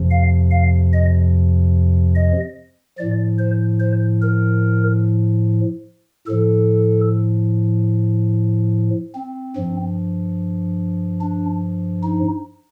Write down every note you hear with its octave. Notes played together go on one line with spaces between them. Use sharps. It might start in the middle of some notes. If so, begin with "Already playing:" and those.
Already playing: F2 C3 F3
F5
F5
D#5
D#5
A2 F3 D5
C5
C5
A#4
A2 F3 A4
C4
G2 F3
D4
D#4